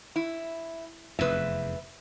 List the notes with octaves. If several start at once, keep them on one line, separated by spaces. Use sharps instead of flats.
E4
F1 E2 B4 E5